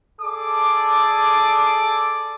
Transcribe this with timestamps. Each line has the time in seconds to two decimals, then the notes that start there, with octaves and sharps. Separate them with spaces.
0.22 G#4 A4 D5 D6